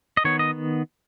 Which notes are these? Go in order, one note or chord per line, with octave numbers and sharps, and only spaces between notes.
D#5
D#3 B3 C#5
D#5